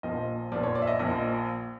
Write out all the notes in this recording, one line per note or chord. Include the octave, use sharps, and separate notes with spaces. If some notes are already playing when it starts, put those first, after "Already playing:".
A#1 A#2 F3 D#5
A#1 A#2 F3 D5
C#5
D5
E5
D#5
A#1 A#2 F3 D#5